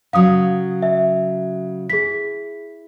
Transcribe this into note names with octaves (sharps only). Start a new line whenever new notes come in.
C#3 F#3 F5 D#6
E5
E4 G#4 B6